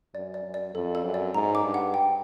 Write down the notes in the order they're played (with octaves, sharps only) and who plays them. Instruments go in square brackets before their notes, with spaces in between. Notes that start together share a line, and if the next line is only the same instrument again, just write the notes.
[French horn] F#2 [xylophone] D5
[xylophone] D5
[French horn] F#2
[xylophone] D5
[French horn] F2 [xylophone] A4
[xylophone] A4
[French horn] F#2
[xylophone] D5
[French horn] G#2 [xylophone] A#5
[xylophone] D6
[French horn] G2
[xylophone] F#5
G5